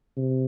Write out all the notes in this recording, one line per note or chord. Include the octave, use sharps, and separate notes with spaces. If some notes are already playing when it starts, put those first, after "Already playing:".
C3